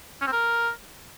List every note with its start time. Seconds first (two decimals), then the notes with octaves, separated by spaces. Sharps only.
0.21 C#4
0.27 C4
0.32 A#4